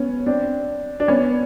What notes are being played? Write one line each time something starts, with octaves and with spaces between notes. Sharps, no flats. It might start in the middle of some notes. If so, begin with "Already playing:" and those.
Already playing: B3 C#4
C4 D4
D4
B3 C#4